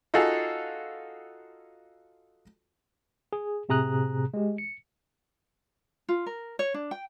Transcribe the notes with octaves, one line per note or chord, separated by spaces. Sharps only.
D#4 F4 F#4 G#4 A4
G#4
A2 C3 G#4 A#5 D#6 F#6
G#3 G4
C#7
F4
A#4
C#5
D4
G5